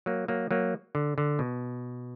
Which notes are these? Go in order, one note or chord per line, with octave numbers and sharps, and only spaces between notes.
F#3 A#3
F#3 A#3
F#3 A#3
D3
D3
B2